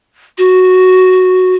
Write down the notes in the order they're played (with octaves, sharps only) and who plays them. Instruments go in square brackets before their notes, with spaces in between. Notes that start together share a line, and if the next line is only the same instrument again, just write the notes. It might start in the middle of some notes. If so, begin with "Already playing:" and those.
[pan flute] F#4